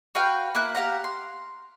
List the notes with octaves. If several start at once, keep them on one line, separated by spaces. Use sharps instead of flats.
F#4 B4 F5 G5
A#3 E4 F#6
G4 F5 F#5 A#5
C6